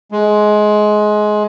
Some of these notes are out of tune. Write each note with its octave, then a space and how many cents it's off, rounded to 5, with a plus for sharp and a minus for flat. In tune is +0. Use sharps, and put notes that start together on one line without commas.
G#3 +20